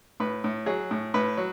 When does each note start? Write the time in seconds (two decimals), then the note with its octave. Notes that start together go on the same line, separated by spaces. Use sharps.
0.20 A2 B4
0.44 A2
0.66 F#3 G#4
0.91 A2
1.14 A2 B4
1.37 F#3